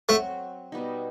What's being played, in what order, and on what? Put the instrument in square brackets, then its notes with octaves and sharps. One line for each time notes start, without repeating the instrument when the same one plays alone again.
[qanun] F#3 C4 F#4 [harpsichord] A3
[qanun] B2 G3 B3 D#4